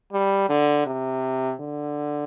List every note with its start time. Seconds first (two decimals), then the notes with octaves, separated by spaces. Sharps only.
0.13 G3
0.49 D3
0.86 C3
1.60 D3